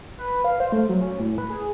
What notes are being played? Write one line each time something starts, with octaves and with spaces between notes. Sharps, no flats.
B4
F5
C5
A3
F#3
C#4
A2
B4
G#4